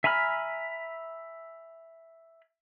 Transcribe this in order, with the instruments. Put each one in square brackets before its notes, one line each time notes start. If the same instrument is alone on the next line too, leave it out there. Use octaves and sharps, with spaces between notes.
[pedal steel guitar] E5 G#5 A#5 B5 F6